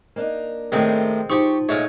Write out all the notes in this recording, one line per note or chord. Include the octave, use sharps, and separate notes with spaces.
A#3 D4 D#4
A2 D#3 G#3 C4
F3 D#4 G4 C#6
A#2 G#3 A3 C#5